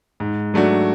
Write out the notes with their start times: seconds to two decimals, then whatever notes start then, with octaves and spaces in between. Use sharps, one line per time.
0.20 G#2
0.54 F#3 A3 D4 F#4